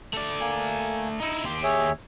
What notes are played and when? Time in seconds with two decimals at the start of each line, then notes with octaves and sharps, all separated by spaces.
0.13 A3 D5
0.41 A#3 G#5
1.20 D#4 E4
1.44 D#2 G4 C6
1.63 G#4 C#5 E5